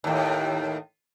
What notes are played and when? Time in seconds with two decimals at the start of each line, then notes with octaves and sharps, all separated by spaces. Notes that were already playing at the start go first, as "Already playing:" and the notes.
0.04 D#2 A2